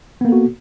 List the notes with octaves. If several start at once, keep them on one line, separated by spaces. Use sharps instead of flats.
A#3 B3 F#4 A4